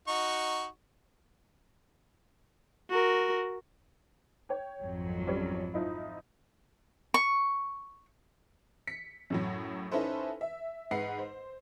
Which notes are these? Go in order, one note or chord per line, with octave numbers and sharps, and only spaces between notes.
D#4 F#4 C#6
F#4 A#4
C#5 G5
G#1 F2 F#3
G3 C#4 C#5
F3 D#4 E4
C#6
B6 C#7
F#2 A2 F#3
C#4 D#4 E4 A4 B4 C5
E5
G#2 B4 F#5 C7
C5